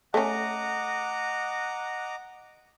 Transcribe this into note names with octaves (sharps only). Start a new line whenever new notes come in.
A3 C#4 D#5 F#5 A#5 D6